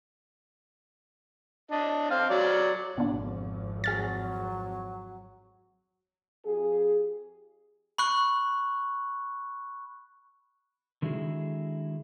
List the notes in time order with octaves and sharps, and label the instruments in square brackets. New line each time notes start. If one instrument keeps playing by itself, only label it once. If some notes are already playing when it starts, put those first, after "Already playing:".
[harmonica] D4 D#5
C4 F5
F#3 D5
[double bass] G#1 F2 [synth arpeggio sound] B2 D3
[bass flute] F#3 [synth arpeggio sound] G#4 F6 A6
[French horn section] F2 G4 G#4
[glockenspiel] B5 C#6 F#6
[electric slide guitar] D3 D#3 G#3 E4 F#4 G#4